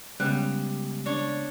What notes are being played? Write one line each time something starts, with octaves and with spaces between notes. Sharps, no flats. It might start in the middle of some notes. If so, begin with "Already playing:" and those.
C#3 G3 G#3 B3 F#6
D4 C#5